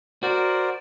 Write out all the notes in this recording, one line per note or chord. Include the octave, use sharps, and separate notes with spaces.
F#4 A#4 C5 D5